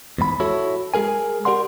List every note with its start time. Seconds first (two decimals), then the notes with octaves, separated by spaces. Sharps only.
0.18 E2 G#2 B5
0.40 E4 F#4 A4 C#5
0.94 G#3 G#4 A#4 G#5
1.45 G4 A#4 D5 F#5 C6